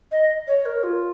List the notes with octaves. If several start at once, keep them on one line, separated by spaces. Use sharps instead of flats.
D#5
C#5
A#4
F4